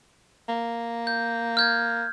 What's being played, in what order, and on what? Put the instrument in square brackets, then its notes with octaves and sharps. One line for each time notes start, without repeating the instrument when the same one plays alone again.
[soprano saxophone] A#3
[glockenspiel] G6
F6 G6 G#6